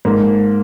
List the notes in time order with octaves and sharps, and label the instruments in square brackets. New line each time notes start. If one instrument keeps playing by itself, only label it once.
[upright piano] G#2 [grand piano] A#3